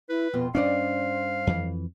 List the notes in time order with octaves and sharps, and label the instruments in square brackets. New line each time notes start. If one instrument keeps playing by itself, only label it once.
[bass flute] E4 [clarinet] B4
[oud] F2 B2 F4 [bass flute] B3
[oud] G2 D5 D#5 [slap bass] C#4 D4 [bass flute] C5 [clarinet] F5
[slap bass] F2 E3